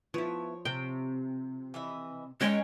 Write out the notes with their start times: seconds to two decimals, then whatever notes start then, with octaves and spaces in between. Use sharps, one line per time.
0.14 F3 B3 E4 C#5
0.65 C3 C4 G5
1.74 E3 D#5 E5
2.41 G#3 C#4 D#4 G#4 C#5 D#5 G5